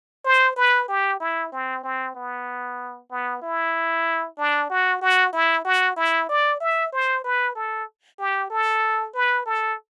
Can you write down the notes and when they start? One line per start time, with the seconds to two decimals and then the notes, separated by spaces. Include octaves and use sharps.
0.25 C5
0.56 B4
0.89 G4
1.20 E4
1.52 C4
1.84 C4
2.16 B3
3.11 B3
3.42 E4
4.38 D4
4.70 F#4
5.02 F#4
5.33 E4
5.65 F#4
5.97 E4
6.29 D5
6.61 E5
6.92 C5
7.24 B4
7.55 A4
8.19 G4
8.51 A4
9.14 B4
9.46 A4